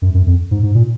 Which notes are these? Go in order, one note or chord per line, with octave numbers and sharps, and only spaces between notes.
F#2
F#2
F2
G#2
G#2
A#2